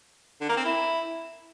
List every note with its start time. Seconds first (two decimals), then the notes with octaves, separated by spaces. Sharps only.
0.41 D3
0.49 A#3
0.57 C4
0.65 E4